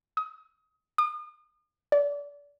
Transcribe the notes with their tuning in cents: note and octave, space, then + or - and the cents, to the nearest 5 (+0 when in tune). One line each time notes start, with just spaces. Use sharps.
D#6 +25
D#6 -40
D5 -30